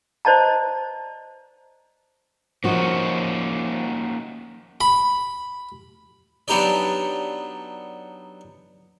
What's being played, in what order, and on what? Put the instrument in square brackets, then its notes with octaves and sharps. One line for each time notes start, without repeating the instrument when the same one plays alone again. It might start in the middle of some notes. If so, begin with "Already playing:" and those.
[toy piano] C5 D5 D#5 A5 A#5
[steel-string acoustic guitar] F3 F#4 [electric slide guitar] A#3 C#4 D#4
[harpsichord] B5
F#3 B3 D4 D#4 G4 D5